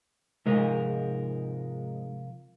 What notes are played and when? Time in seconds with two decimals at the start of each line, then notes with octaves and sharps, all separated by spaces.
0.46 G#2 C3 F3 G#3 A#4